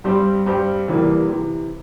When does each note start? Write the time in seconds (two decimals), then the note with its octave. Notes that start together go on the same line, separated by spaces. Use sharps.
0.04 G2 G3 C4 G4 C5
0.46 G2 G3 C4 G4 C5
0.88 E2 C3 E3 G3 A#3
1.29 C3 E3